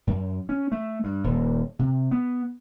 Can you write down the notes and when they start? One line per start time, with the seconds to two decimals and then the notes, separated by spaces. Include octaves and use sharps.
0.07 F#2
0.49 C#4
0.72 A3
1.04 G2
1.24 D#1
1.79 C3
2.11 B3